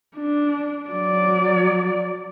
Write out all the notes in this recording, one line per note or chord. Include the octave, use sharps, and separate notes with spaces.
D4
F#3 D5